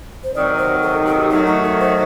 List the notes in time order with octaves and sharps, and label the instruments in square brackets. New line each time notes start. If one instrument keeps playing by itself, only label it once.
[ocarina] C5
[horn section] C3 D#3 F#3 [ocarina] D5
[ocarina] C5
A4
G4
[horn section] D#3 F#3 A3 [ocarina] D#4
[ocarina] D#4
A4
C5